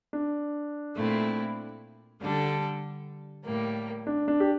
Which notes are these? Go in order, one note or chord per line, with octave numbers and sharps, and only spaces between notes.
D4
A#2 A3 C4 E4
D3 G3 D4 A4
A2 G3 A#3
D4
D4
G4